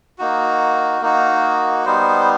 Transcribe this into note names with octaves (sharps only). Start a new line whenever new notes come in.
A#3 D#4 F#4
A#3 D#4 F#4
G3 B3 D#4 C5